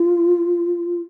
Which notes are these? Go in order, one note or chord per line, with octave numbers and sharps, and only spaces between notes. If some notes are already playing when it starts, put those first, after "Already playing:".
Already playing: F4